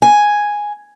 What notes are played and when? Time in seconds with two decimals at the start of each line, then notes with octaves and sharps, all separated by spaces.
0.02 G#5